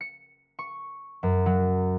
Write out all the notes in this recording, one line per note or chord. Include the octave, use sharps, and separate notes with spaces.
C#7
C#6
F#2
F#3